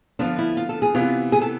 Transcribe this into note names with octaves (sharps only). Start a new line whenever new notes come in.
D3 F3 B3 D4 F4
E4
F4
A4
G#4
C3 E3 B3 F4
G#4
A4